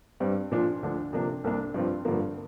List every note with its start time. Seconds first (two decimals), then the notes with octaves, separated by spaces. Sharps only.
0.20 G2 G3 C4
0.51 A#2 F3 D4 F4
0.83 D2 D3 F3 D4
1.13 C3 F3 A#3 D4
1.44 C2 C3 A#3 D4
1.74 G2 F3 C4 F4
2.05 G2 D3 F3 A#3